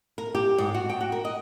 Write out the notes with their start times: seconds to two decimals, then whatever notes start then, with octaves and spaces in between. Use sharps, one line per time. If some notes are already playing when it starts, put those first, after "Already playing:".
0.18 A#4
0.35 G4
0.58 G#2
0.74 F#4
0.90 G5
1.01 F#4
1.12 A#4
1.25 D#5